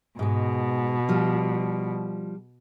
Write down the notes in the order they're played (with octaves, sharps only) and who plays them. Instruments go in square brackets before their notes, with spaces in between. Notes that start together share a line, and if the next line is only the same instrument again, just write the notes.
[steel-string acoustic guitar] G#2 G#3 [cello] B2
[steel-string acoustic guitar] F3 G3